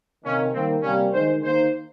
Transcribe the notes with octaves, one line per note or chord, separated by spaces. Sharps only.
C3 D#3 A#3 C#4
D#3 G3 A#3 C4
C3 G3 A#3 C#4
D#3 G#3 C5
D#3 A#3 C5